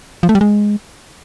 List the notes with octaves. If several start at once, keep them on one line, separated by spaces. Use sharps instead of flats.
F3
A3
G3
G#3